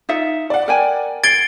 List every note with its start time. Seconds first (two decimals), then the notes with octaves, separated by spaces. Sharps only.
0.09 D#4 F4 E5
0.50 D5 F#5
0.68 A#4 G5 G#5
1.24 G#6 A6 C7 D7 G7